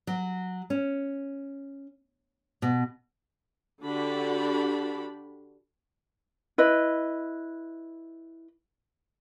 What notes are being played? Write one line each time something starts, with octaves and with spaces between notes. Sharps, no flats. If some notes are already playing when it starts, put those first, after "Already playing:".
F#3
C#4
B2
D3 D4 F#4 G4 B5
E4 B4 D#5